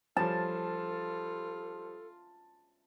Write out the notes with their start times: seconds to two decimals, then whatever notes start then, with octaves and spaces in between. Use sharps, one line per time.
0.17 F3 G3 F4 A4 A5